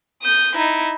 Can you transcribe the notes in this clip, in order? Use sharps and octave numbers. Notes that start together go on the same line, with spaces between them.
D#6 G6
D#4 E4